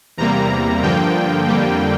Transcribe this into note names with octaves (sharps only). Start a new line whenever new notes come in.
E2 C3 G3 A#3 A#5
G2 D3 F3 A#3 G5
F2 D3 G3 A#3